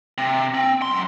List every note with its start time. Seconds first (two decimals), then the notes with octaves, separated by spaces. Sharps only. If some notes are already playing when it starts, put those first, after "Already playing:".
0.18 C3
0.54 C4
0.82 F#2 C6